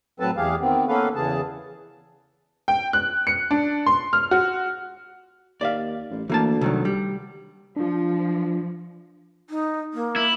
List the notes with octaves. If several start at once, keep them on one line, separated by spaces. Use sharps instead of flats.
A2 F#3 C4 A4 B4 A5
E2 E3 G4 G#4 F5
D#3 B3 C4
A#3 B3 C#4 A4 B4 F5
E2 C#3 E3 G#4 A5
G5
F#6
C#7
D4
C6
F6
F#4
D#2 D5 E5 F5
A1
D2 E3 A#3 A5
C2 D#3 F#3
G3
F3 D4 F4
D#4
A#3
E4